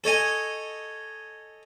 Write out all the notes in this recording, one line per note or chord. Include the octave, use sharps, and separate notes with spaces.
A4 C#5 D#5 G#5